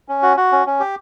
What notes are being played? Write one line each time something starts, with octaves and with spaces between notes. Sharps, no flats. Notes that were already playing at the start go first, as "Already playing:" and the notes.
C#4
F#4
F#4
C#4
C#4
G4